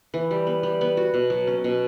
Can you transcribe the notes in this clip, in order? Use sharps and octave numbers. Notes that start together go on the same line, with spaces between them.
E3
G3
B3
G3
B3
F#4
B2
F#3
C#4
B2